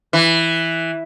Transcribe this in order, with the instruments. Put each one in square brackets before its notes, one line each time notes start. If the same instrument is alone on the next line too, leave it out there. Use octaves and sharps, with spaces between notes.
[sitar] E3